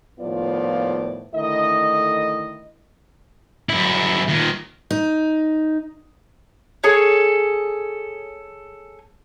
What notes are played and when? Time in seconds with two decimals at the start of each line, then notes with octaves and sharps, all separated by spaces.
0.20 D#2 A2 F3 B3 F4 D5
1.34 D3 D#3 A3 E4 D#5
3.69 F#2 E4
4.28 A#2 D#3
4.91 D#4
6.84 G#4 A4 C#5